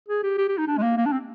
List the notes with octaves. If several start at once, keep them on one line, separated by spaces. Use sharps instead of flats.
G#4
G4
G4
G4
D#4
D4
G#3
A#3
A#3
D4
C4